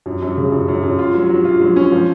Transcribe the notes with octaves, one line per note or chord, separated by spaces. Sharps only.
F#2
F#2
C#3
F#2
F#2
F#2
F4
F#3
F#3
F4
F#3
C#4
F3